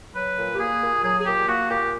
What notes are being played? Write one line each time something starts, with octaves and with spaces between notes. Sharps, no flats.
F#3 B4
A#2
G4
A#3 G#4
A#2
F#3 G#4
G#4
A#2 G4
A#3 F#4
A#2 G4